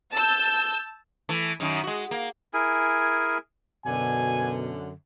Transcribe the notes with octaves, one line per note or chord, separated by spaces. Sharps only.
A5 E6 G6
E3 A3
F#2 D#3
G#3 F#4
A#3
E4 G#4 A#4 G#5
F#2 B2 D3 G#5